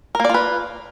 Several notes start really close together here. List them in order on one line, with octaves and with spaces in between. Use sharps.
A#4 A#3 D5 F4 B4